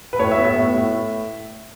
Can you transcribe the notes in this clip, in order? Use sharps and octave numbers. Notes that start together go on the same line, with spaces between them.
B4
A2 C#5
E5
B3
E5
A2
A2